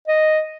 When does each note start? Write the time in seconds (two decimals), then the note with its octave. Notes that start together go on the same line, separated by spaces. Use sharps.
0.08 D#5